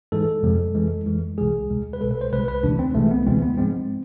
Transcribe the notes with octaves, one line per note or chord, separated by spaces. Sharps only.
G#2 E3 G#3 A4
F2 C3 F3 G#3
F2 E3 G#3
F2 E3 G#3
C2 C3 E3 G#3 G#4
D2 C3 G#3
B4
C2 B2 G#3 A4
B4
C5
C2 C3 G#3 B4
B4
D2 C3 E3 D4
C4
C2 C3 E3 G#3 A3
B3
D2 C3 E3 G#3 C4
B3
G#2 F3 G#3 C4